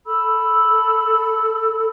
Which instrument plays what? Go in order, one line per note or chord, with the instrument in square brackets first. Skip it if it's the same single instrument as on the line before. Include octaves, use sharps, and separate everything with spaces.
[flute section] A4 B5 E6